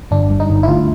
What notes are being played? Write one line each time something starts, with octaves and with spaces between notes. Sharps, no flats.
G1 D4
G2
D#4
G1
E4
D2 F4